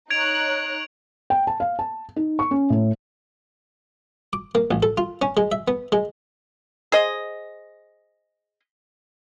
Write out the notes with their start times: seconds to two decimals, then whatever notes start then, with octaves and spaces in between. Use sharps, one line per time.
0.10 D#4 C#5 F#6 G#6 D7 F7
1.30 G5
1.47 A5
1.60 F5
1.79 A5
2.16 D#4
2.39 C#6
2.51 C#4
2.70 A2
4.33 D6
4.55 A#3
4.71 A1
4.83 A4
4.98 F4
5.22 C#4
5.37 G#3
5.52 E5
5.68 B3
5.92 G#3
6.92 G#4 C5 D#5